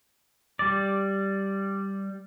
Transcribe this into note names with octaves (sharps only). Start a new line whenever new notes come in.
G3 D5